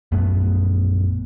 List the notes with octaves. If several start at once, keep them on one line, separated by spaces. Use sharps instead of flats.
A#1 F#2 A3 B3